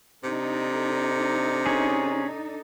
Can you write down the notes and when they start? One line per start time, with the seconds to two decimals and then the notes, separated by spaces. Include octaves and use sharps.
0.24 C3 D4 D#4 A4
1.66 C#4 G#4